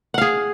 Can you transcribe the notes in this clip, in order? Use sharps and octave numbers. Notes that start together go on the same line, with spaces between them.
G#4 F5 F#5